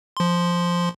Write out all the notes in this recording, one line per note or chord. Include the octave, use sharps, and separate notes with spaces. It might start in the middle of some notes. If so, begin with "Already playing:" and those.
F3 C6